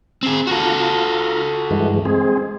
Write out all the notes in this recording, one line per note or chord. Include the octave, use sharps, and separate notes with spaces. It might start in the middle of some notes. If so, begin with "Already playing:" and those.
C4 G#4
F4 F#4 A4 A#5
G2 E3 G#3
G#3 C4 G#4